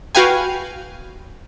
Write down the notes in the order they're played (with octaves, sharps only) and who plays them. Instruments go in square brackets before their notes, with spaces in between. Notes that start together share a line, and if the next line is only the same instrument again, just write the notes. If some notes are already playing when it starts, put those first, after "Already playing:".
[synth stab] F#4 B4 F5 G5 G#5